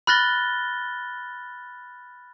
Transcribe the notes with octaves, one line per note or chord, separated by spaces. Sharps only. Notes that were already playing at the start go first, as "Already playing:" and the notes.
B5 F6 F#6 A6 A#6 G7